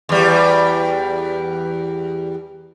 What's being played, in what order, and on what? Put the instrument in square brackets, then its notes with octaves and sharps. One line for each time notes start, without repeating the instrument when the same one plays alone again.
[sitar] E2 G3